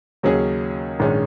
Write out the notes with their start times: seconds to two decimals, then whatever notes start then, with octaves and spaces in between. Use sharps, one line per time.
0.23 D#2 C#3 F#3 C#4 G#4
0.99 A#1 G#2 D#3 G#3 C#4